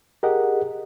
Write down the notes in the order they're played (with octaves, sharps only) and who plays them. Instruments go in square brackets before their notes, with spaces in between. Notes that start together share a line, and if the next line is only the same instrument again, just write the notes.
[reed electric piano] G4 G#4 A#4 D#5 F#5